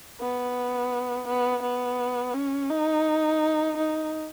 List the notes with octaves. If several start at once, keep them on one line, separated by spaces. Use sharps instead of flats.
B3
B3
B3
C#4
D#4
D#4